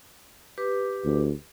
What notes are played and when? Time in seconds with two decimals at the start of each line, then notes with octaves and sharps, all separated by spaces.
0.58 G4 B4 D6
1.05 D2